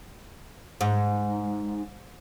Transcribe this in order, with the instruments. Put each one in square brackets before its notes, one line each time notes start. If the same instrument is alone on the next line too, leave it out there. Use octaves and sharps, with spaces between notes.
[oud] G#2